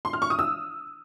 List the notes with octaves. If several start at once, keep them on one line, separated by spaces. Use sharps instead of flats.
C6
F6
C#6
D#6
E6